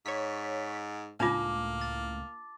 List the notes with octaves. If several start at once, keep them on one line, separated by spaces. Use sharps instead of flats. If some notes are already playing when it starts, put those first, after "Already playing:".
G#2 C#5 B6
C#2 A2 A#3 D4 D#4 F4 A5 D6
A6